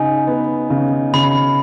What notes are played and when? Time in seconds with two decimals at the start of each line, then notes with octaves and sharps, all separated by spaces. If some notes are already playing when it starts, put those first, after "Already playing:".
Already playing: C#3 D#4 G#5
0.27 B3
0.70 C#3
1.14 C#3 B5